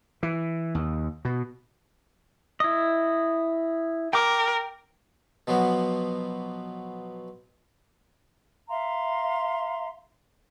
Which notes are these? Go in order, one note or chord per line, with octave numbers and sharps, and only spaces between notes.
E3
D#2
B2
E4 D#5
A#4 G5 D6
B2 F3 F#3 B3
E5 F5 A#5 C6